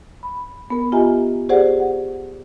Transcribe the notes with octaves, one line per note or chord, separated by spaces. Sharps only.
B5
B3 A#4
F4 G4 D#5 E5 G#5 A#5
G4 G#4 C5 D5 F#5
F#5